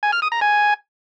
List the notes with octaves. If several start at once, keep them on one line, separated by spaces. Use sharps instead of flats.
G#5
F6
D#6
A#5
G#5